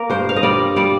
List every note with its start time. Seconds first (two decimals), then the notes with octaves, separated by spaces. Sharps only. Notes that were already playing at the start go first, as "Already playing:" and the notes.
Already playing: A#3 A#4
0.10 G2 C5
0.29 F5
0.36 D#5
0.43 G3 D5
0.76 G3 D5